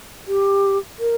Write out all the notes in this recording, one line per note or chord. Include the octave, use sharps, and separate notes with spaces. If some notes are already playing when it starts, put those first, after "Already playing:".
G4
A#4